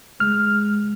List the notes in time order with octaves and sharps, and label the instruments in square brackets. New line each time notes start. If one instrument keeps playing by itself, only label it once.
[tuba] G#3 [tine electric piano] F6